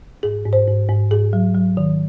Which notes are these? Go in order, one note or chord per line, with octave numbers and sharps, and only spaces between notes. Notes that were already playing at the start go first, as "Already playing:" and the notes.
G#2 G#4
G#2
C5
G#2
G#2
G#2 G#4
F#3
F#3
D#3